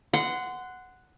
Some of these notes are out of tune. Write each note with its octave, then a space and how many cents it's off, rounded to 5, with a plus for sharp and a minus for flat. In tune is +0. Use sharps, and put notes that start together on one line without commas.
F#5 +0 C6 -25